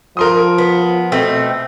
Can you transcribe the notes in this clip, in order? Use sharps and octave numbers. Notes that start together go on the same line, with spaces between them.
F3 A#4 C6 D#6
B3
B2 A3 C4